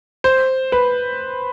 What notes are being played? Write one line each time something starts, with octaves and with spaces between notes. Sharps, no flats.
C5
B4